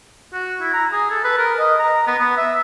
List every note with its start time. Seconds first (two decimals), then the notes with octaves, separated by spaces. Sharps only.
0.33 F#4
0.60 E4
0.73 A#5
0.92 G#4
1.11 A4
1.24 B4
1.38 A#4
1.59 D#5
1.79 A#5
2.07 B3
2.19 B3
2.37 E5